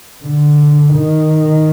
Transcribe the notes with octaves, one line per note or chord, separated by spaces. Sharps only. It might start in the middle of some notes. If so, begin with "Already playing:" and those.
D3
D#3